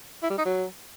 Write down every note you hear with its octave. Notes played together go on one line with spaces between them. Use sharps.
E4
G3
D#4
F#3